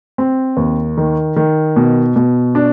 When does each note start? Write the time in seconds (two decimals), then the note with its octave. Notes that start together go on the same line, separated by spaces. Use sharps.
0.18 C4
0.57 D#2
0.97 D#3
1.36 D#3
1.76 B2
2.16 B2
2.55 D4